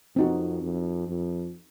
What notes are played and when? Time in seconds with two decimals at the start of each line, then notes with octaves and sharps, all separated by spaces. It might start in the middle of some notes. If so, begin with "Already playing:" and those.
0.16 F2 C4 D#4 F#4
0.62 F2
1.09 F2